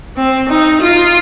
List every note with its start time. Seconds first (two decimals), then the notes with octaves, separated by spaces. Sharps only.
0.17 C4
0.49 D#4
0.82 F4